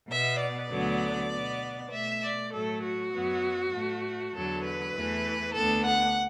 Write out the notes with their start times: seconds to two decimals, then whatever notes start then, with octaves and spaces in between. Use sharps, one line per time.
0.10 B2 B3 E5
0.41 D5
0.71 D2 D3 F#3 B3
1.31 B2 B3
1.92 B2 A3 E5
2.22 D5
2.52 A2 F#3 A3 A4
2.83 F#4
3.13 F#2 F#3 B3
3.74 A2 A3
4.34 E2 D3 F#3 A4
4.65 B4
4.95 E2 E3 A3
5.55 D2 D3 B3 A4
5.85 F#5